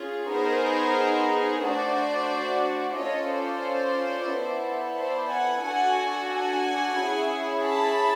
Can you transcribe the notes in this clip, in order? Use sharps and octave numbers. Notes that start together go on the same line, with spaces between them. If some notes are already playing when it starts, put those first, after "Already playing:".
Already playing: C#4 F4 G#4
B3 D#4 G#4 A#4 C5
A3 D4 F#4 C5 D5
C#4 F4 A4 C#5 D#5
C5 D5
B3 E4 A4
C5 D5
F#5 G#5
D4 F#4 A4 F#5 G#5
F#5 G#5
C#4 E4 G#4
A5 B5